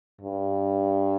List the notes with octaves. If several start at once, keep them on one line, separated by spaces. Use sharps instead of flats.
G2